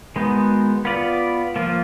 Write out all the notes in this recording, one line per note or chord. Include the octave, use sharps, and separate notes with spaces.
D#3 G#3 B3 D#4 F#4
B3 F4 B4 D5
F3 A#3 F4